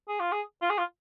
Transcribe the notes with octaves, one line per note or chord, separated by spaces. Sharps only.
G#4
F4
G#4
F4
G#4
F4